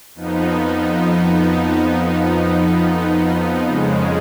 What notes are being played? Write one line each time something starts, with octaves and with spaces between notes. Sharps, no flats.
F2 F3 B3 D#4
F2 C#3 G#3